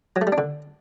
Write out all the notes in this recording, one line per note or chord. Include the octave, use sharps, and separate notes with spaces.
F#3
A3
G3
D4
D3